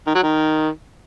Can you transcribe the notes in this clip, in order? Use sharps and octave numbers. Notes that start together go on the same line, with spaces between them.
D#3
F#3
D#3